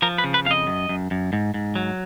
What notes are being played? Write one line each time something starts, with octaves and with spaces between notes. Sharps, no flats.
F3 A#4
B4
C#3
B4
F2 F5
D#5
F#2
F#2
F#2
G#2
G#2
F#3